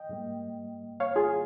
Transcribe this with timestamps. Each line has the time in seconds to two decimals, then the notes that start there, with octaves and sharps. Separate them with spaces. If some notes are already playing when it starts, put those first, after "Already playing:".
Already playing: D#5 G5
0.09 G#2 G3 A#3
1.00 C#5 F5
1.16 F4 G#4